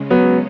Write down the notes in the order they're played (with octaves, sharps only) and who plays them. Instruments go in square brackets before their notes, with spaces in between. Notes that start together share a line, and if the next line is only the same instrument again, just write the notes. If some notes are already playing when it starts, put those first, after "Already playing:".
Already playing: [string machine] C#3 G#3 C#4
[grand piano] F#3 B3